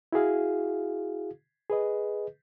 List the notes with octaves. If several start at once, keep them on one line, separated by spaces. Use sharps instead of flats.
E4 F#4 G#4 F5
G#4 B4 D#5